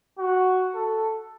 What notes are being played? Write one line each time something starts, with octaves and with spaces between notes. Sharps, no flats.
F#4
A4